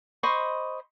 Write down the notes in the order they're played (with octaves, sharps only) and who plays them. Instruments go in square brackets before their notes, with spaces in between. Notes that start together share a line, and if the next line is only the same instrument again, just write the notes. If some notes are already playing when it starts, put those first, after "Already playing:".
[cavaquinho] C5 D#5 B5 C#6